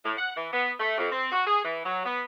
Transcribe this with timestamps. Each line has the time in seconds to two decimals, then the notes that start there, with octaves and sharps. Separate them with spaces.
0.04 A2
0.17 F#5
0.36 E3
0.52 B3
0.80 A3
0.97 F2
1.11 C4
1.32 F#4
1.46 G#4
1.64 E3
1.84 F#3
2.04 B3